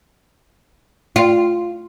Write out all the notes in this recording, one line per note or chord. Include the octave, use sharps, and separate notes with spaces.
F4